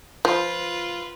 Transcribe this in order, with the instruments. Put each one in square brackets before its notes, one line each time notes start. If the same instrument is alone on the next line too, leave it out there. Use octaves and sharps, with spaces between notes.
[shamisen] F3 [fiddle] F4 B4